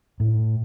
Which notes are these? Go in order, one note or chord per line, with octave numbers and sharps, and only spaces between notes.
A2